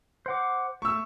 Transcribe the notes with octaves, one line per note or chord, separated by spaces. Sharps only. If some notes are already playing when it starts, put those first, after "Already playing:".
C5 F#5 D6
A3 C#6 E6